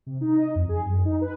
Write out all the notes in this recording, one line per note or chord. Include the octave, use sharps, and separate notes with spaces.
C3
D#4
D#5
F2
G#4
F#2
D#4
B4